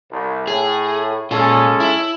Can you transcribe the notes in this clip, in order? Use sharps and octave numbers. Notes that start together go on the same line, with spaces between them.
C2
A2 G#4
A#2 G#3 C#4 F4 A4
E4